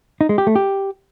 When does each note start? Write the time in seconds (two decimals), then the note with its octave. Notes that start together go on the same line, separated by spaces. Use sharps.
0.21 D#4
0.29 G#3
0.38 G4
0.47 A3
0.56 G4